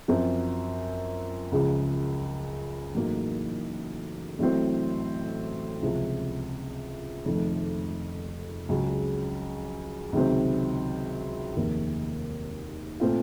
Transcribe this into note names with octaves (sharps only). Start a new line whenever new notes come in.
F#2 F3 C4
C#2 C#3 F3
A1 A2 F#3 A#3 D#4
A1 A2 F#3 C4
C#2 C3 F3
F1 F2 D#3 A3
C#2 C#3 F#3
C#2 C3 D#3 F#3 C4
F1 D#2 D#3 A#3
A#2 A3 C4 F4